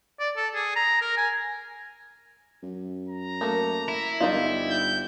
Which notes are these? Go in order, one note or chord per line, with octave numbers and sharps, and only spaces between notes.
D5
A4
G#4
A#5
A#4
G#5
F#2
A#5
A3 A#3
E4
G1 G3 D#4 F4
G6